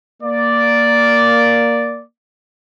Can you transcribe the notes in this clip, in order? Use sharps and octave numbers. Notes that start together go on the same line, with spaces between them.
A#3 D5